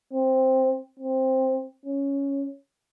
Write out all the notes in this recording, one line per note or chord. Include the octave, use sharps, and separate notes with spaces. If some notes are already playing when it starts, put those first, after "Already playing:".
C4
C4
C#4